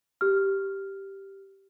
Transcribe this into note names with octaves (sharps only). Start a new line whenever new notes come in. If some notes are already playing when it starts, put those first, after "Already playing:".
G4 F6